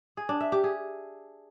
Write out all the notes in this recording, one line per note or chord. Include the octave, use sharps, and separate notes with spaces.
G#4
D4
E5
G4
G#4